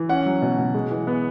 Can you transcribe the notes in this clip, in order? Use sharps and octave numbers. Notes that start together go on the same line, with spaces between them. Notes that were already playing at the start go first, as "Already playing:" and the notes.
Already playing: E3
C#4 F#5
F#3
B2
B2
G#3
E3
B3